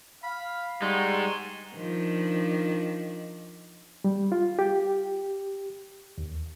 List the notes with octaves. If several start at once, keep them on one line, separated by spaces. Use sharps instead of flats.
F5 B5
G3 G#3 D#4 D5 F#5 C6 C#6
D#3 F3 D4
G3
F4
G4
D#2